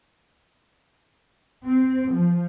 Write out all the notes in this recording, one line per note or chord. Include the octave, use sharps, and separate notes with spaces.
C4
F3